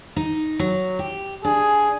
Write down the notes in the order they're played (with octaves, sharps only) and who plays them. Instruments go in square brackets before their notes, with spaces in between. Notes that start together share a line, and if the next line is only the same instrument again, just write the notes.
[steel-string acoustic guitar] D#4
F#3
G4
[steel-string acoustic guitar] D4 [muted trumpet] G#4